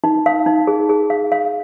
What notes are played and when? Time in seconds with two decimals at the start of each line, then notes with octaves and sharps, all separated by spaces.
0.04 D#4
0.26 F5
0.46 D#4
0.67 G#4
0.89 G#4
1.10 F5
1.32 F5